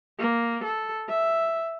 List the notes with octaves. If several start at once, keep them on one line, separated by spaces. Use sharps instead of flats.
A#3
A4
E5